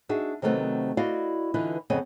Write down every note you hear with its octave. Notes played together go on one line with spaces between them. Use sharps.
D4 D#4 F#4 G#4 E5
C3 D#3 F#3 A3 B3 C4
E4 F#4 D5 D#5 F5
D3 E3 D#4 F4 B4
F2 C#3 B3 C4 C#5 D#5